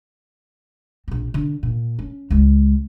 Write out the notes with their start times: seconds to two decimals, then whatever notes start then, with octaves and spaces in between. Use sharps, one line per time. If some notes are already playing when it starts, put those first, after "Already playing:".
1.08 A#1 C4
1.34 D3
1.63 A#2
1.99 C#4
2.30 C#2 G#3